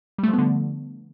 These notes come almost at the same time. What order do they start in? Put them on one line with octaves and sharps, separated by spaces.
G3 A3 F3 B3 D3